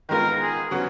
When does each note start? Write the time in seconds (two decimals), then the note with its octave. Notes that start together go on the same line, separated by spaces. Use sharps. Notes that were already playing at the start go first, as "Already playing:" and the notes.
0.09 D#3 G#3 B3 F4 A#4
0.41 G#4
0.71 C#3 F#3 B3 F#4